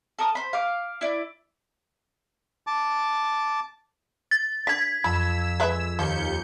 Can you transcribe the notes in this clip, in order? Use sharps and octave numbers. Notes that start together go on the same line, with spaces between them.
A4 A#4 D#6
C5 B5
F5 D6
E4 D5
A5 D6
A6
D3 G#6 B6
F2 B5 E6
G#3 B4 E5
D#2 F3 G6 C#7